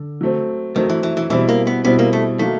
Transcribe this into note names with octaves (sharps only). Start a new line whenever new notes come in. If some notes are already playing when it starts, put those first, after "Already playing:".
Already playing: D3
F#3 A3 C4
D#3 F#3 A3 C4
E3
E3
E3
B2 E3 G3 C4 E4
A#3
B3
B2 G3 B3 C4 E4
A#3
A3
D#3 F#3 A3 A#3